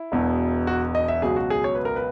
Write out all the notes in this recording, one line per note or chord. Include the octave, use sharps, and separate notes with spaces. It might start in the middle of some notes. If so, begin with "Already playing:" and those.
Already playing: E4
E1 E2 B2 F#3
F#4
D#5
E5
C#2 B2 F#3 G#4
F#4
G#4
C#5
B4
A#4
B4